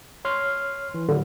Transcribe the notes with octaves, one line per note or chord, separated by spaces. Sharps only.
C#5 C6 F6
E3
A2 D3 F#3 G3